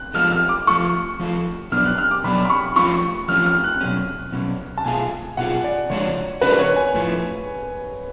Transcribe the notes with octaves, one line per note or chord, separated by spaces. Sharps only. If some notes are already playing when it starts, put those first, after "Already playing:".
Already playing: F#6
F3 G#3 B3 F4 A4 F6
F6
D6
F3 A3 F4 A4 C#6
F3 A3 F4 A4
B2 F#3 B3 D4 F6
F#6
F6
D6
B2 F#3 B3 D4 B5
B5
C#6
F3 A3 C#4 F4 C#6
F3 A3 C#4 F4 F6
F6
F#6
B2 F#3 C#4
B2 F#3 C#4
A5
B2 A3 F4 G#4 G#5
B2 A3 F4 G#4 F#5
D5
C#3 F3 G#3 D4 F#4 C#5
C#3 F3 G#3 D4 F#4 B4
B4
C#5
G#5
A2 F3 A3